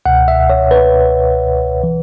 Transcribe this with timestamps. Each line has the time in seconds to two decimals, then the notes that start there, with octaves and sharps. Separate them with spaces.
0.06 C#2 B2 F#5
0.28 E5
0.50 C#5
0.71 B4
1.84 E3